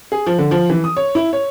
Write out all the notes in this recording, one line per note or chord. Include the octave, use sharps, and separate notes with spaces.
G#4
F3
D3
F3
E3
D#6
C#5
E4
C#5